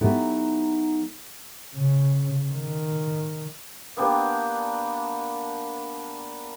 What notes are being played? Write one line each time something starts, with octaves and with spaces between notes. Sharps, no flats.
F#3 B3 D#4 E4 G4 A4
C#3
D#3
A#3 B3 D4 G4